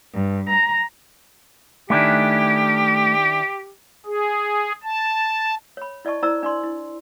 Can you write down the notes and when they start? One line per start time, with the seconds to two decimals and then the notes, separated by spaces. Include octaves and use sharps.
0.12 G2
0.48 A#5
1.90 D#3 A3 D4 E4 G4 G#5 F#6
4.06 G#4
4.84 A5
5.77 C#5 B5
6.05 E4 D5 D#5 A5 C#6
6.22 E4 C5 D5 A#5 E6
6.43 D4 D5 C6
6.63 E4